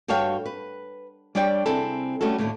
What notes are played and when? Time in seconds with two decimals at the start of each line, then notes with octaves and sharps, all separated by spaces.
0.08 G2 F#4 A4 C#5 F5 G5
0.46 B4
1.35 G3 D4 C#5 D5 G5
1.66 C3 C4 E4 G#4 A4
2.21 G3 A3 C#4 F#4 A4
2.38 D#2 A2 D3 A3